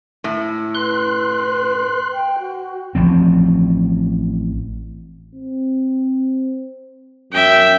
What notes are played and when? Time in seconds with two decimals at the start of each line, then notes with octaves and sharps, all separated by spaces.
0.24 A2
0.75 B4 C6 F#6
2.13 G5
2.40 F#4
2.95 A1 F3 C4
5.35 C4
7.32 F#2 E5 G5